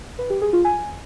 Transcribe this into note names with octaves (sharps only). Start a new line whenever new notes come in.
B4
G4
G#4
F4
G#5